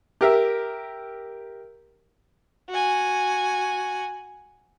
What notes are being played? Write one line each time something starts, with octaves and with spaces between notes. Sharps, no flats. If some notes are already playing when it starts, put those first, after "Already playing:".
G4 A#4 E5
F#4 G#5